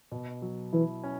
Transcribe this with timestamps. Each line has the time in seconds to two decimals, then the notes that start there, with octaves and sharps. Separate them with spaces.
0.12 B2
0.42 F#3
0.73 E3 E4
1.03 C#4